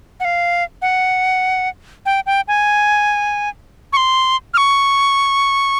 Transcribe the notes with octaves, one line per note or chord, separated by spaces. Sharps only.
F#5
F5
F#5
G5
G5
G#5
C#6
C6
F6
C#6